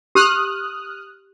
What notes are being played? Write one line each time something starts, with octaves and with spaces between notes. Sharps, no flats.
G4 D#6 F6 F#6